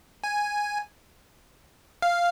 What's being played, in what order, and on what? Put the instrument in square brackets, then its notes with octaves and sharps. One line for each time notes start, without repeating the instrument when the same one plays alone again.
[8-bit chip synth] G#5
F5